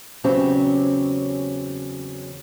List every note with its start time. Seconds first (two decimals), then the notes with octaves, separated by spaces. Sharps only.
0.24 E2 C#3 F#3 C4 C#4 G4